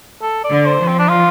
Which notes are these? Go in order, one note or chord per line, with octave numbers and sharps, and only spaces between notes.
A4
D5
D3
C5
F3
C4
D4
F4